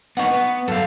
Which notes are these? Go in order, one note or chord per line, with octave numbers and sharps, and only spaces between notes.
B3 D#4 F#5 C#6
B3
F#2 A4 F5